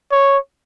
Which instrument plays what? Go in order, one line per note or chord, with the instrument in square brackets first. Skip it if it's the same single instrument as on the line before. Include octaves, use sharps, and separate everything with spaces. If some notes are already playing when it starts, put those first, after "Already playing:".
[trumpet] C#5